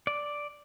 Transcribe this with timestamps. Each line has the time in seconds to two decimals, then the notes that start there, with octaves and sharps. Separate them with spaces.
0.07 D5